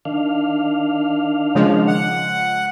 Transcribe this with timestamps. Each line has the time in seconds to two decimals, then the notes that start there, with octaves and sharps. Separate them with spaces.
0.05 D#3 D4 F5
1.55 C#3 F3 G#3
1.87 F#5